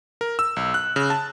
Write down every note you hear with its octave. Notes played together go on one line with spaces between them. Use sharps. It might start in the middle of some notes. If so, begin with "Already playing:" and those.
A#4
E6
B1
F#6
C#3
A5